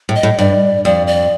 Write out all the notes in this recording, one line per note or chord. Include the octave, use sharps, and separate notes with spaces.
A2
D#5
A2
G2 D5
F2 D5
D5